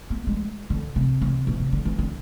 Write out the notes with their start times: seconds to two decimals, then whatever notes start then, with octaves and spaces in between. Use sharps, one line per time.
0.10 B3
0.27 G#3
0.70 D3
0.96 C3
1.21 C3
1.47 B2
1.60 C3
1.72 D3
1.85 E3
1.98 D3